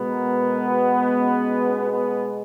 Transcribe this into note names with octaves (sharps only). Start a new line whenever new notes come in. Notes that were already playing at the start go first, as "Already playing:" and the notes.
Already playing: B2 G#3 B3
A#4
A#4
F#4
C#4
C#4
B3